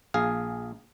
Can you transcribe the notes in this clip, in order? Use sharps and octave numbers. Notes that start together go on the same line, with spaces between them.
A#1 G#4 F5